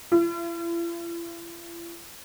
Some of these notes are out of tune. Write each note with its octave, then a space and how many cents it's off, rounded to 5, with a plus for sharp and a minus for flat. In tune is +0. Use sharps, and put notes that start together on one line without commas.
E4 +45